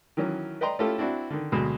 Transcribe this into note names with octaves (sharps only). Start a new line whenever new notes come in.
D#3 E3 F#3 C#4
B4 D5 D#5 G5 A#5 C6
A3 C#4 E4 F4 G4 A4
C4 D4 E4 F#4
D3 D#3
D2 B2 F#3 G#3